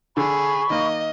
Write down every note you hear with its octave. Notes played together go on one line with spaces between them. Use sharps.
D3 G#4 B5 C#6
D#3 A#3 D#5